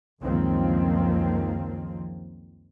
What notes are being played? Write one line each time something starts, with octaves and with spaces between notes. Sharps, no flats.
C#2 F#2 D#3 F3 A#3 C4